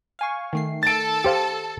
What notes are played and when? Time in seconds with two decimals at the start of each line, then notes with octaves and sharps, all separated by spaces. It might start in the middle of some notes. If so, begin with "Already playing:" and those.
0.19 F5 G#5 C#6
0.53 D#3 A3 C7
0.83 A4 A5 A6 D7
1.24 G4 C5 F5